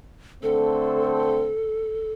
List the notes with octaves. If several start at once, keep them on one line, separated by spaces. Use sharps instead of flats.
D3 A3 C4 A4